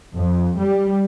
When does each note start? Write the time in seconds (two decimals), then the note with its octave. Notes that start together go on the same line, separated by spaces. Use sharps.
0.16 F2
0.59 G3